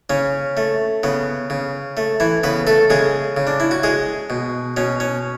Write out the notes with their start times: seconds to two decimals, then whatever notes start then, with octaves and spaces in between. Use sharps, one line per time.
0.10 C#3 C#4
0.57 A3
1.04 C#3 B3
1.50 C#3
1.97 A3
2.20 E3 E4
2.43 C#3 B3 B4
2.67 A3 A4
2.90 C#3 G#3 G#4
3.37 C#3
3.47 D4
3.60 E4
3.71 F#4
3.83 G#3 G#4
4.30 B2
4.77 B2 C#4
5.00 C#4